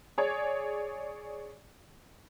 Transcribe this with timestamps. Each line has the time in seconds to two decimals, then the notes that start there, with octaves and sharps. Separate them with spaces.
0.18 G#4 C#5 D5